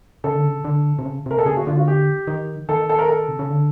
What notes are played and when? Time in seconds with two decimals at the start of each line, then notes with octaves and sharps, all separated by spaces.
0.24 C#3 A4
0.35 D3
0.47 C#3
0.65 D3
0.99 C3
1.05 C#3
1.26 C3 A#4
1.38 A4
1.46 C#3 G#4
1.57 F#4
1.67 D3 F4
1.77 F#4
1.88 G4
2.27 D#3
2.69 D#3 A4
2.89 A4
2.99 A#4
3.08 A4
3.28 C3
3.39 C#3
3.50 D3